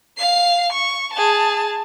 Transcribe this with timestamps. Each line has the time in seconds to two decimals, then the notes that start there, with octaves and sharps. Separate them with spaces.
0.17 F5 C7
0.72 C#6
1.13 G#4 A5